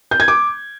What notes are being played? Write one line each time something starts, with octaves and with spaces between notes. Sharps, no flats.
G6
G#6
D6